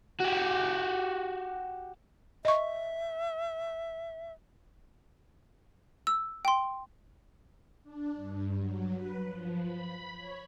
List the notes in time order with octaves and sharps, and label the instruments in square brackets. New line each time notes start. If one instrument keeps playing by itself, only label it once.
[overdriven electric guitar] F#4 G4
[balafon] D#5 C#6 [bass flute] E5
[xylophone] E6
G5 C6
[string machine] D4
G2
F#3
B4
F3
B5
C#5